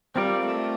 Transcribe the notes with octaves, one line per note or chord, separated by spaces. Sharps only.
G3 C4 F4 A#4 D5 F5
A3